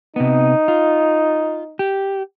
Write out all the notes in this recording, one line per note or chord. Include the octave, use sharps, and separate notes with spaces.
C3 B3 D#4
F4
G4